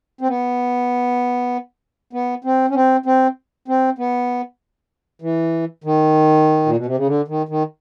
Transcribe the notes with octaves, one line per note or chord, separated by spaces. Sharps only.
C4
B3
B3
C4
C#4
C4
C4
C4
B3
E3
D#3
A#2
B2
C3
C#3
D3
D#3
D#3